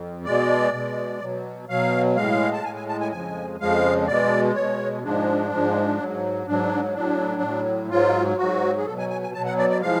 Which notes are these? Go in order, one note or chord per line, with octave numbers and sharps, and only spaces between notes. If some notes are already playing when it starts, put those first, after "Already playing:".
Already playing: F2
B2 G#3 D5
B2 G#3
B2 F#3
B2 F#3 F5
A2 G#3 F5
A5
A2 G#3 G#5
G#5
A5
G#5
F2 C#3 F3 G#3 G#5
F2 C#3 F3 G#3 F5
B2 G#3 D5
B2 G#3 C#5
G#2 F3 G#3 D4
G#2 F3 G#3
G#2 F#3
G#2 F#3 D4
A2 F#3 D4
A2
F#3
G#2 F#3 F4
G#2 F#3 F#4
G#4
B2 F#3 A4
G#5
G#5
G#5
B2 F#3 A5
F#5
D5
D5
A2 F3 G#3 F5